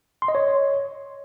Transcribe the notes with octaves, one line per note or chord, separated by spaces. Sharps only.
C6
D#5
C#5